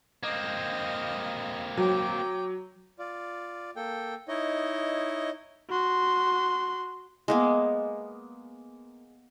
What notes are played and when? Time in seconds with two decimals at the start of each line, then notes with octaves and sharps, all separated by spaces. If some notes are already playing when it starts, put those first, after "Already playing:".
0.23 A#3 C4 D#5 F5
1.77 F#3 G5 D6
2.99 F4 D5
3.76 A#3 A4 G5
4.28 D#4 E4 C#5 D#5
5.70 F#4 C6
7.28 G#3 A#3 B3